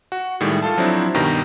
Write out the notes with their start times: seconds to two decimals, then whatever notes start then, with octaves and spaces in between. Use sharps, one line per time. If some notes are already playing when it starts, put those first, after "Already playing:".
0.12 F#4
0.40 A2 D#3 G3 G#3
0.62 F4 A4 A5
0.77 F3 F#3 C4 D4 E4
1.14 G2 B2 D#3 G4 A#5